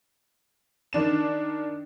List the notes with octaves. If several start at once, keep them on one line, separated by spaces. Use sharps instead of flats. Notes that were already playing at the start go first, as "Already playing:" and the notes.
D#3 D4 E7